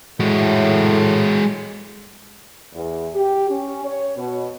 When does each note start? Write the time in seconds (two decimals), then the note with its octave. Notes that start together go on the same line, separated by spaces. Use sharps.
0.20 A2 G#3 F#4
2.73 E2
3.14 G4
3.49 C#4
3.85 C#5
4.17 B2